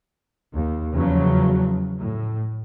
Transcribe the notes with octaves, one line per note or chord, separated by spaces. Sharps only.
D#2
E2 C#3 F3 F#3
A2